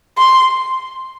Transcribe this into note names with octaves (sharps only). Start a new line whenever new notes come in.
C6